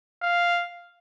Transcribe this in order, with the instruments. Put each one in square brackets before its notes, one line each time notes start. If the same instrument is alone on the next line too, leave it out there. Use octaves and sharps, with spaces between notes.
[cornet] F5